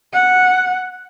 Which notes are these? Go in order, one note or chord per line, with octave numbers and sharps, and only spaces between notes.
F#5